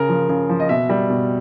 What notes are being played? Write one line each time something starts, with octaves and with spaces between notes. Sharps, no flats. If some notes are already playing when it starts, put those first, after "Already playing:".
Already playing: C#3 A#4
F3
C#3
F3
D#5
B2 E5
G3
B2